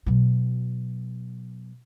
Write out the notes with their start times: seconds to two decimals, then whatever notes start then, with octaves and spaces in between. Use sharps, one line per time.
0.06 B2 F#3